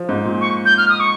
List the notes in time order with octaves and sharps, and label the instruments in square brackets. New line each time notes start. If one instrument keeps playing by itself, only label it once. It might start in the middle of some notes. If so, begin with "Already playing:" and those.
Already playing: [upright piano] F3
G#2
A#2
[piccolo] C#6
G6
F6
D#6
C#6